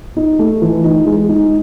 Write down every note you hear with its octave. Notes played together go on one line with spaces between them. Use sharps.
D#4
A3
E3
D#4
G#3
D#4